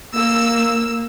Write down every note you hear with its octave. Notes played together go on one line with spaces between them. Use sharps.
A#3 E6